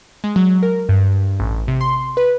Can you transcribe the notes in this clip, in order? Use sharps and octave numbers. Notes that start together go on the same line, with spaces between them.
G#3
F#3
A#4
G2
A1
C3
C6
B4